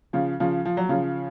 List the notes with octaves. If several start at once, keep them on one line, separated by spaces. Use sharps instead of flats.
C#3 F3
C#3 F3
F3
F#3
C#3 F3